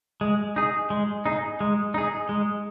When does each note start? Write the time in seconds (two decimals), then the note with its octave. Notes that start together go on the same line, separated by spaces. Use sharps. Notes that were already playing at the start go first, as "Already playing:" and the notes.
0.21 G#3
0.56 D#4 G#4
0.90 G#3
1.26 D#4 G#4
1.61 G#3
1.94 D#4 G#4
2.29 G#3